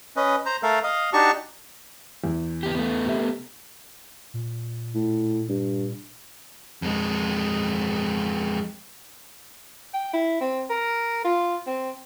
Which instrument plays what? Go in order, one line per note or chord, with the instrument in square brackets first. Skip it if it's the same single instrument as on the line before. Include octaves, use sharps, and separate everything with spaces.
[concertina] C#4 B4 D#5
C5 A#5
A3 A4 A#4 F5
D#5 F5
D4 D#4 F#4 G4 A5 C#6
[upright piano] E2
[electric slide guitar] B3 G4
A3 B3
[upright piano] C3 E5
[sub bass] A#2
[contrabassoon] A2
G2
[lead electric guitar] F2 G#3
[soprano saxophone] G5
E4
C4
A#4
F4
C4